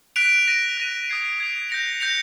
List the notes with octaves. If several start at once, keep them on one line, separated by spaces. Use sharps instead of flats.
F#6 B6 D7 F7
F#6 A#6 D#7
F#6 A#6 D#7
D#6 G#6 C7 F7
D#6 G#6 C7 F7
G6 A#6 C#7 F7
G6 A#6 C#7 F7